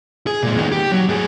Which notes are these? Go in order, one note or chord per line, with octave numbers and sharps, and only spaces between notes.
G#4
A#2 G#3
D#3 B3
G4
F#3
A2 G#4